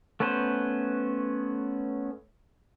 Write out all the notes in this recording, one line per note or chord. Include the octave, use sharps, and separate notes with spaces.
A3 B3 C#4 B4 C5